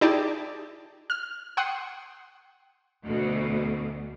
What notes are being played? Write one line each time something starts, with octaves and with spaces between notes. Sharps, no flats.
D#4 E4 G4 G#4 D5 A5
F6
F#5 G5 C6 D#6 C#7
D2 B2